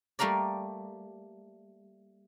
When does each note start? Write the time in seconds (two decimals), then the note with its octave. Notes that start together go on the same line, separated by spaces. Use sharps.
0.19 G3 A3 A#3 A#4 D5